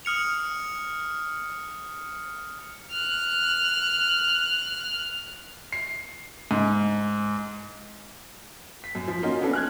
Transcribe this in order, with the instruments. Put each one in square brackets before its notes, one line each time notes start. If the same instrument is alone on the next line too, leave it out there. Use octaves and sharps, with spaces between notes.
[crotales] D#6 F6 C#7 F7
[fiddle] F6 F#6
[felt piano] C7
G#2
[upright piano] B6
F#2
F3
A#3 C#4 D#4 F4 F#4
B3 C#4 D4 A4
F6 F#6 G#6